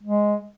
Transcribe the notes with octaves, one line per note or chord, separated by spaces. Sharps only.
G#3